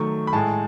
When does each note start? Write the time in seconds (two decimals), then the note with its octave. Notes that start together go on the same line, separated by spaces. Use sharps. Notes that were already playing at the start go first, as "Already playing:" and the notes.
Already playing: D#3 F#3 A3 C#6
0.27 B5
0.33 A2 G#3 A5